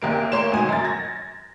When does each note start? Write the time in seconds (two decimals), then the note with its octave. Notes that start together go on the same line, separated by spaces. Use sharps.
0.02 F#1 C3 A#3 D7
0.32 A2 A#3 C#5 C6 E7
0.52 D2 G#2 B2 G#5
0.69 F#2 A6
0.84 G#6 A#6